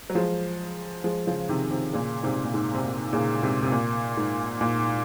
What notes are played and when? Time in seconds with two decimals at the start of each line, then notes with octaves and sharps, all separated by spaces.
0.10 F#3
0.15 F3 G#3
1.04 F3 G#3
1.27 C#3 F3
1.49 C3 D#3
1.71 C3 D#3
1.93 A#2 C#3
2.23 G#2 C3
2.44 A#2
2.54 G#2
2.74 C3
2.84 A#2
3.13 A#2 C#3
3.43 G#2 C3
3.63 C3
3.72 A#2
4.17 G#2
4.61 A#2